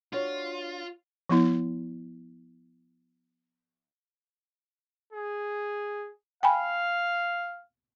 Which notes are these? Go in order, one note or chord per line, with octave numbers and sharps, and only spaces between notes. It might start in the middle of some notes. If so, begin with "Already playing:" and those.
D4 F4 F#4 C#5
F3 B3 E4
G#4
F5 G5 G#5 B5